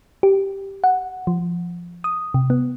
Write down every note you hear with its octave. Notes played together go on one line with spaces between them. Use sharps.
G4
F#5
F3
D#6
C3
B3